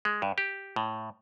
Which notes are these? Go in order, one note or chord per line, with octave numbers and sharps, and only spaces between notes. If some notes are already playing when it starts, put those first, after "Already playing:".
G#3
G2
G4
A2